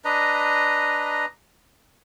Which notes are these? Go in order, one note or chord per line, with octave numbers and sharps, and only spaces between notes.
D4 B4 D#5 A#5